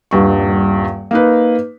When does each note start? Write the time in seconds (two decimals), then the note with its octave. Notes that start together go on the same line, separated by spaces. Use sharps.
0.11 D#1 G2 C#6
1.11 A#3 D#4 B4